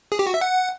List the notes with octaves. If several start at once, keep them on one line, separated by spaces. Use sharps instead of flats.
G#4
G4
F#4
E5
F#5